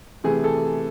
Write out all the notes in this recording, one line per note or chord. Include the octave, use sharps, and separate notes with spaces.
C3 E3 A3 G#4
A4